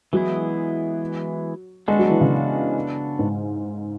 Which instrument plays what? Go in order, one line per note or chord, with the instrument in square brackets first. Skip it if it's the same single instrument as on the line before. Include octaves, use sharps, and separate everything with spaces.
[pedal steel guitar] E3 G#3 B3 E4 G#4 [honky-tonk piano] F#3
[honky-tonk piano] G#3 [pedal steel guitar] B3 D4 F#4 A4
[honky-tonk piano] F#3
E3
C#3
G#2